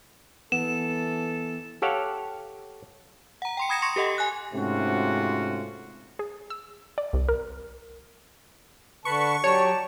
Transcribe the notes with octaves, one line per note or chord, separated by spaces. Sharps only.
E3 B3 A4 E7
G4 A4 C#5 F5 F#5
F#5 A#5
G5 C6 C#7
B5 D#6 G#6 A#6 C#7 E7
C6 C#6 A#6 C#7
G4 A4 D#5 F#5
G#5 F#6
G#2 C3 A3 C#4 F4 F#4
G#4
E6
D5
C2
A#4
D3 B4 A5 B5 C#6
F#3 G4 C#5 D5 G5 A5